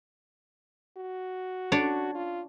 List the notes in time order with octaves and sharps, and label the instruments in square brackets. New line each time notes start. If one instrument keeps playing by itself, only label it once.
[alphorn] F#4
[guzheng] D4 C#5 D5
[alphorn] F4